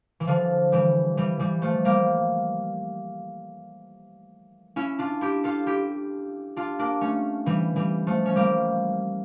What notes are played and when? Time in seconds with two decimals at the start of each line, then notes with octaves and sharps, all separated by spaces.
0.20 E3
0.27 D3 F3
0.72 E3 G3
1.17 E3 G3
1.39 E3 G3
1.62 F3 A3
1.85 G3 A#3
4.76 C#4 E4
4.99 D4 F4
5.21 E4 G4
5.44 F4 A4
5.66 E4 G4
6.56 D4 F4
6.79 A#3 D4
7.01 A3 C#4
7.46 E3 G3
7.76 E3 G3
8.07 F3 A3
8.25 C#4
8.36 G3 A#3